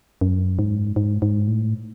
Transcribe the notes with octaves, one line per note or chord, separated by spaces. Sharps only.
F#2
G#2
G#2
G#2
A2